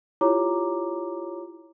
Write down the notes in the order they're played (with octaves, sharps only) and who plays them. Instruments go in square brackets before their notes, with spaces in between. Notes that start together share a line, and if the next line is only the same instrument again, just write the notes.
[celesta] E4 F4 G4 C#5 A#5 D6